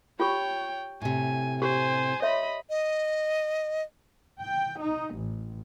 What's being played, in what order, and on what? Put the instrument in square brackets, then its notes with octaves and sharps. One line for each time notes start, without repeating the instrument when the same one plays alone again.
[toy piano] F4 G4 C#6 [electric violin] C#5 G5
[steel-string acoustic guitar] A2 C3 [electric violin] G#5
[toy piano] G4 [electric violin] C5 G#5
[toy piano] C#5 E5 C6 [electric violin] D#5 B5
[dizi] D#5
[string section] G5
D#4
A1